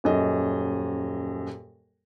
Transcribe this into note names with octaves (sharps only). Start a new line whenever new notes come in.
D#1 F#2 D#5